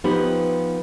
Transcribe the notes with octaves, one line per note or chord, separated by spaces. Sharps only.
F3 B3 D#4 G4 B4